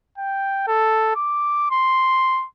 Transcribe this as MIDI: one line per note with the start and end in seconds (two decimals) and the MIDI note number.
0.18 0.68 79
0.68 1.15 69
1.16 1.67 86
1.71 2.46 84